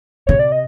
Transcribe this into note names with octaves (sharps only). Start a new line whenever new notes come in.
C3 C#5
D5
D#5